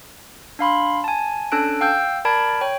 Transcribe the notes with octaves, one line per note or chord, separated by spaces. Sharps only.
D4 F5 B5 C6
G#5 A5
C#4 D4 A4 A5 F#6 D7
F5 G5 E6 G6
A#4 D5 A5 B5 G#6 D7
C#5 G5